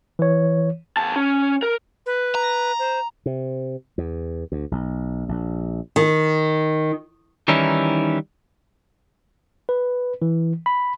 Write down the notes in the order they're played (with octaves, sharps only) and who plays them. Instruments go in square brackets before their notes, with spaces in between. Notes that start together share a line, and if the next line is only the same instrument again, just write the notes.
[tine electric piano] E3 C#5
[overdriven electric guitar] E2 A5
C#4
A#4
[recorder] B4
[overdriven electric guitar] A#5
[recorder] C5
[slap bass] C3
E2
D2
B1
A#1
[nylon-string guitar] D#3
[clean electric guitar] D#3 E3 G3 C#4 D#4 E4
[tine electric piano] B4
E3
B5